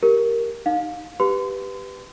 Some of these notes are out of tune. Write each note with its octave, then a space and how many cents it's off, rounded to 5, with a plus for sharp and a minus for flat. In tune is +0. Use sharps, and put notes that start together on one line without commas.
G4 +0 A#4 +0
D#4 +0 F5 +25
G4 +0 B4 +0 C6 -40